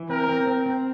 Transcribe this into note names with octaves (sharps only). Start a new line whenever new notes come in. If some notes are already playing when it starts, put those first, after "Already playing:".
Already playing: E3
C4 A#4
C4
C4
C4